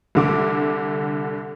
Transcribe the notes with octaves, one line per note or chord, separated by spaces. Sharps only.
C2 D3 D6